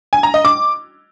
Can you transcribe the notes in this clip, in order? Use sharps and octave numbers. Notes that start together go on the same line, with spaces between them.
G#5
A#5
D#5
D6